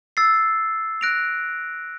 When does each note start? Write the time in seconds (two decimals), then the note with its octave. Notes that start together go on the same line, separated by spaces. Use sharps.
0.17 E6 A6 C7
1.01 F#6 A#6 D7 F7